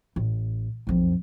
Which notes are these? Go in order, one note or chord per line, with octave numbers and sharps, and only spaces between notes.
A1
B1 F2